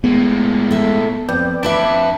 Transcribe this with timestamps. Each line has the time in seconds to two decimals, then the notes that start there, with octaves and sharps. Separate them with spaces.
0.04 A2 G#3 A#3 B3
0.71 A4 E5
1.29 F2 B4 D5 G5
1.63 F2 D4 B4 E5 A5 B5 D6